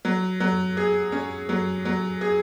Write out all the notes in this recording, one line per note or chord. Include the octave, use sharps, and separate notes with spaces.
F#3
F#3
G#4
C#4
F#3
F#3
G#4